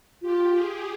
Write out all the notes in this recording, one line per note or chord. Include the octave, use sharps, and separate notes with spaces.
F4 G4
G#4